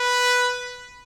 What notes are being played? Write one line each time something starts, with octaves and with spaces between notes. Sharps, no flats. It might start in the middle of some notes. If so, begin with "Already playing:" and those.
Already playing: B4